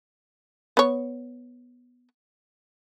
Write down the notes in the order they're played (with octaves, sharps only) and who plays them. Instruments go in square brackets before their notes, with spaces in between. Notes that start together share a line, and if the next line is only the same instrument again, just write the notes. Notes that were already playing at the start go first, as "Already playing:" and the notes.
[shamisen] B3 C#5